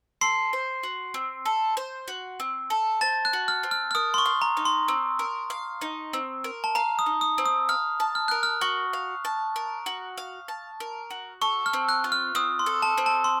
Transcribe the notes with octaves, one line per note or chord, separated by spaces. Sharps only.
A4 C6 C7
C5
F#4
C4
A4
C5
F#4
C4
A4
C5 A5 A6
F#6
F#4
F6
C4
F6
F6
A#4 D#6
C6
C#6
F5
A#5
D#4
C6
C4
A#4
F5
D#4
C4
A#4
A5
F5 A#5
D#6
D#4
D#6
C4
D#6
F5 F6
A5
F6
A#4 F#6
F6
F#4 C#6
F5
A5
A#4
F#4
F5
A5
A#4
F#4
A4 C#6
F6
C4
F#6
F4
F6
C4 D#6
C6
A4
A5
C4
A5
C6